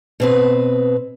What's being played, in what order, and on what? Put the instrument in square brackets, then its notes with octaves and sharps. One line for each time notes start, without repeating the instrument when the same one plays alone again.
[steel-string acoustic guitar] B2 C4 B4